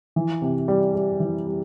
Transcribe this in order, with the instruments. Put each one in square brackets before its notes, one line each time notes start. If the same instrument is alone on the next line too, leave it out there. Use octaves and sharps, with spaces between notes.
[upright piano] E3
C3
G3
G3
E3
G3